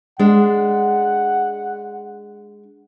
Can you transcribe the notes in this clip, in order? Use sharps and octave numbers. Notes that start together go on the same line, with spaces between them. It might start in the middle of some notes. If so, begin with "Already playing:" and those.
G#3 D4 F#5